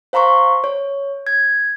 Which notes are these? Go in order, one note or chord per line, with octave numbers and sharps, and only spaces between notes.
C5 F5 A#5 C6 C#6
C#5
G#6